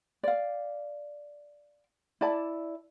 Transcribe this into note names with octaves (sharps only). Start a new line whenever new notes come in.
D5 F5
E4 D5 A5